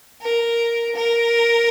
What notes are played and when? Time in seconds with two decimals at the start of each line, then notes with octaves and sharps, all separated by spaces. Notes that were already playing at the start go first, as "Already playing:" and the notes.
0.20 A#4
0.95 A#4